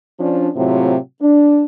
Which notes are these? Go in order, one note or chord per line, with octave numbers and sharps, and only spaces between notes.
F3 C#4 D4
A2 C3 F#3 C4 F4
D4